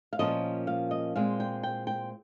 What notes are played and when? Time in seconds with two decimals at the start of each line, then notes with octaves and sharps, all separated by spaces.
0.13 F5
0.19 A#2 F3 A#3 C#4 D#5
0.67 F5
0.91 D#5
1.16 A#2 G#3 C4 F5
1.40 G5
1.63 G5
1.87 G5